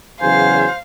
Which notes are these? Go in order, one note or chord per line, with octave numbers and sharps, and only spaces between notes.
E2 C#3 F#3 C5 F5 G#5